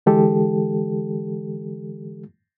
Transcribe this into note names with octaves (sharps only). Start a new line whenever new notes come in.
D3 E3 G#3 G4 A4